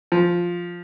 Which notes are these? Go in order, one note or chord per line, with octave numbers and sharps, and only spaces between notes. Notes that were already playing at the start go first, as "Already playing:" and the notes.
F3